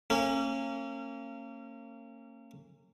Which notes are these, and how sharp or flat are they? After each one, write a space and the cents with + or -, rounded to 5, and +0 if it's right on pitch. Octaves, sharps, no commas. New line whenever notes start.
A#3 -35 C#4 -30